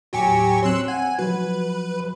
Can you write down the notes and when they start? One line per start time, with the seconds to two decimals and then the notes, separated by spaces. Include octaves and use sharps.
0.13 D#2 A2 F#3 G4 G#5 C#6
0.63 C4 C#5 C6 E6 F#6
0.88 F#5 G#5
1.19 F3 F#3 F#4 B4